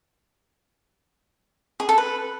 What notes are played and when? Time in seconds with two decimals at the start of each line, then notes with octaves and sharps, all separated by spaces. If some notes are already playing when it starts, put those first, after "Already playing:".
1.80 G#4
1.89 A4
1.98 B4